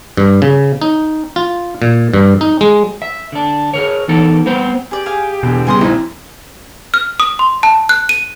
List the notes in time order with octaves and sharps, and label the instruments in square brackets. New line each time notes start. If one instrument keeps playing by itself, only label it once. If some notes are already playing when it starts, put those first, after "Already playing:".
[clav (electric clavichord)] G2
C#3
D#4
F4
A#2
G2
D#4
G#3
[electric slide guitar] E5
D3 D4
G#4 A#4 C#5
E3 B3 D#4 A4 A#4
G3 B3 C4 C5
[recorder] G4 [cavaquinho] G#4 D5
[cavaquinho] G#4 F5 G#5
[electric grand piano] E2 D3 [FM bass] B2
[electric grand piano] C#3 G3 B3 [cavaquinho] G#5 C6 D#6
[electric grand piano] A#1 C4 [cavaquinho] D#4 G#5 [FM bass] E4
[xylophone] F6
D#6
C6
A5
F#6
D#7